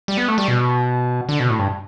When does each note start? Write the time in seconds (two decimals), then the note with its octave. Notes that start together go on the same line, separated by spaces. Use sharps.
0.08 G3
0.17 B3
0.28 A3
0.38 G3
0.48 B2
1.29 D3
1.40 B2
1.50 A2
1.59 G2